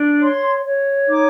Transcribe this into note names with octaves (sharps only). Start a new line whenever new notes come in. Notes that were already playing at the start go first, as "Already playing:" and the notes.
Already playing: D4
C#5 C6
C#5
D#4 D6